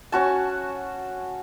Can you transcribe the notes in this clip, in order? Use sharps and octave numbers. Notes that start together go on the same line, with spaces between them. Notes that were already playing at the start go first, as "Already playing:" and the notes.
C#4 F#4 A5